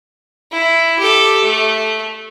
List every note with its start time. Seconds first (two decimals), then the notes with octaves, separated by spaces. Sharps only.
0.52 E4
0.99 G4 A4
1.44 A3